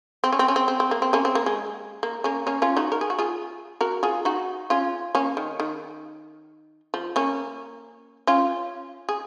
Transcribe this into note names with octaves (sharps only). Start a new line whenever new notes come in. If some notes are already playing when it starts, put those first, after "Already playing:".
C4
C#4
C4
C#4
C4
C4
C4
A#3
C4
A#3 C#4
C4
A#3
G#3
A#3
A#3 C#4
A#3 C#4
C#4 F4
D#4 F#4
A#4
G#4
F#4
F4 G#4
F#4 A#4
F4 G#4
D#4 F#4
C#4 F4
A#3 C#4
D#3
D#3
F3
A#3 C#4
C#4 F4
G#4